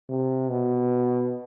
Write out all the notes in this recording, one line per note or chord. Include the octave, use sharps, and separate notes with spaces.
C3
B2